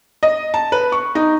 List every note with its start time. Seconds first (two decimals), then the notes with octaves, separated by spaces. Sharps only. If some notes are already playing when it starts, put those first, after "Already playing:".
0.23 D#5
0.54 A5
0.72 B4
0.92 C#6
1.15 D#4